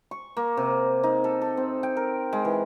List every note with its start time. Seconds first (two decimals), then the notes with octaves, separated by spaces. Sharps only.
0.11 C#6
0.37 A#3
0.57 C3
1.03 D#4
1.24 A4
1.42 A4
1.57 C4
1.83 G5
1.97 A#4
2.33 G#3
2.45 E3